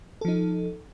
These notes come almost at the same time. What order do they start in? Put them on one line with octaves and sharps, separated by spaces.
A4 F3 D#4